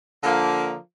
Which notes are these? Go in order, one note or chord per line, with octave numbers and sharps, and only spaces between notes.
D3 F3 A#3